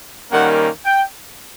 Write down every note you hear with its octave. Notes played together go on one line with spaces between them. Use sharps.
D#3 G3 A#3 C#4 F#5
G5